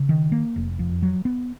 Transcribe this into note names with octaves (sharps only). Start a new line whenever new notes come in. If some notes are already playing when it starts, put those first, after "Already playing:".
Already playing: C#3
D#3
A#3
F1
F2
F#3
B3